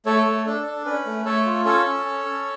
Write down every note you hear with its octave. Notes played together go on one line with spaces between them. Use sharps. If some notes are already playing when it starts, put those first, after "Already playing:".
A3 A4 C#5
A3
D4 A4
D4
C#4 B4
A3
A3 A4 C#5
F4
C#4 A4 C#5
C#4
C#4
C#4